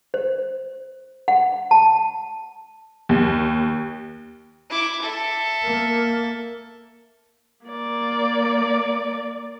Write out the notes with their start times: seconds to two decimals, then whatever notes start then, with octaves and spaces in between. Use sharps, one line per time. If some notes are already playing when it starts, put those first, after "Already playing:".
0.14 C5
1.28 F#5
1.71 A5
3.09 D#2
4.70 E4 D6
5.02 A4 E5
5.63 A#3
7.66 A#3 D5